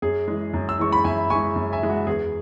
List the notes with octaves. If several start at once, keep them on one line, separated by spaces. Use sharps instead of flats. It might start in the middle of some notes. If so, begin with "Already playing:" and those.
F#2 G#4
E3 G#3
F#2
E6
E3 G#3 C#6
B5
F#2 E5 G#5
E3 G#3 G#5 C#6
F#2
E5 G#5
E3 G#3
F#4
E2 G#4